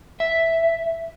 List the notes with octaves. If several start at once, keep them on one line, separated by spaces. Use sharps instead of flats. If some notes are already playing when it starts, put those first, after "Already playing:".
E5